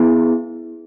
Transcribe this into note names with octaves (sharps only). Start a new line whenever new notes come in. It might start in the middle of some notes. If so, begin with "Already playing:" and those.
Already playing: B3 E4 G#4